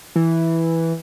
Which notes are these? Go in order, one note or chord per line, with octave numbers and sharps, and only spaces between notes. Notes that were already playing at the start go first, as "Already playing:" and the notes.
E3